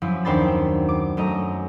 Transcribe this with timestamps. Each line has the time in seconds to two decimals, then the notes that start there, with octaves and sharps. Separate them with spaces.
0.02 F#2 F3 E4
0.25 D#2 C4 D4 C5 B5 A6
0.89 D6
1.17 F#2 A3 D#5 A#5